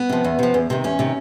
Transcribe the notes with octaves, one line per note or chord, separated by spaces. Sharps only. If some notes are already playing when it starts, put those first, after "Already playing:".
Already playing: B3
C3 F3
E2
C3 F3
E2
C3 D#3
E2 C#4
C3 D#3